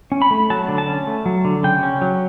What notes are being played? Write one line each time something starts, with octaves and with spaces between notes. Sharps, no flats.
C#4
B5
A3
F#3 A5
D3
A5
C#4
A3
F#3
D3
C#3 G5
C#4
F#3